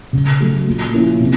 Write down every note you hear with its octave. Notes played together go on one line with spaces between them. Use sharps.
C#3
F#3 A3
A#2
F3 A#3 C#4 E4
C3